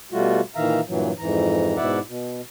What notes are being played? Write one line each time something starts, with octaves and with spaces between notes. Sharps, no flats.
B2 G3 A3 F4 F#4
A#2 D#3 E3 E5 F5 A#5
G2 A#2 E3 F#3
F2 G#2 E3 A#5
G#2 B2 E4 D5 E5 F#5
B2